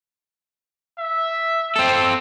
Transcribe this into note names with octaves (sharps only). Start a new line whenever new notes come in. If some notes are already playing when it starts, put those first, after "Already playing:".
E5
C4 A4